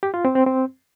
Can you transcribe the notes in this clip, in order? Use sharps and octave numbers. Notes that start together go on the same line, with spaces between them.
G4
F4
C4
C4
C4